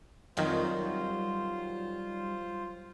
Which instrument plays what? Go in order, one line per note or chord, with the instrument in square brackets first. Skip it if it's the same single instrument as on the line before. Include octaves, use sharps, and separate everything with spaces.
[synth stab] F2 D#3 [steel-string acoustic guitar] F#3 F#4 [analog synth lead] G3 [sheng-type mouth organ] F4 C5